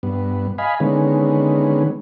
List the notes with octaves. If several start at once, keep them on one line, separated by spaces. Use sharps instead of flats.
G2 B3
D#5 F5 G#5 B5
D3 D#3 G#3 B3 C#4